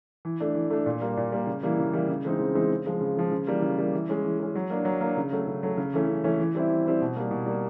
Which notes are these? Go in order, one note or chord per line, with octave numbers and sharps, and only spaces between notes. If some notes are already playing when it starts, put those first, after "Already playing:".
E3
A3 D4
E3
A3 D4
A#2
G3 A#3
A#2
G3 A#3
C#3
E3 G3 A#3
C#3
E3 G3 A#3
C#3
E3 G#3 C4 D#4
C#3
E3 G#3 C4 D#4
C#3
F3 G#3
C#3
F3 G#3
C#3
E3 G3 A#3
C#3
E3 G3 A#3
E3
G#3 C#4
E3
G#3 C#4
F#3
A#3 D4
F#3
A#3 D4
C#3
F#3 A3
C#3
F#3 A3
C#3
E3 A3 C#4
C#3
E3 A3 C#4
E3
G3 C4 E4
E3
G3 C4 E4
B2
G3 A#3
B2
G3 A#3